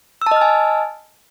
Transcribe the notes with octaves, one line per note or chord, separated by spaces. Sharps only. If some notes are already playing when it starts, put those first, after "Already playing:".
D#5 G#5 A5 E6 F6